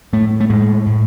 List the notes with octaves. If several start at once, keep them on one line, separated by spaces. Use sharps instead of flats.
A2 A3
A3
A2 G#3
A2